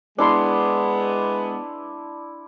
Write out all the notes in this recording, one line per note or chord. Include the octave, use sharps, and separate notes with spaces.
G#3 B3 D4 E4 C6